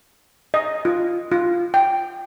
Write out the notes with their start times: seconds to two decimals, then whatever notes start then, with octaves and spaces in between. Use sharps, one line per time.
0.54 D#5
0.85 F4
1.31 F4
1.74 G5